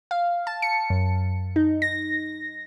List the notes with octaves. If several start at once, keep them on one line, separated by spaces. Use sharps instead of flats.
F5
A5
C#7
F#2
D#4
A#6